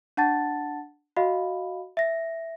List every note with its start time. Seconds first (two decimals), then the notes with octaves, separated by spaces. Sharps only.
0.17 D4 F#5 A5 A6
1.16 F#4 D#5 F5 B5
1.97 E5 A#6